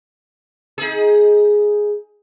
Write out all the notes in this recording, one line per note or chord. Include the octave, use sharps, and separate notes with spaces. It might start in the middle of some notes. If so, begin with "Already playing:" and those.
D#4 G#4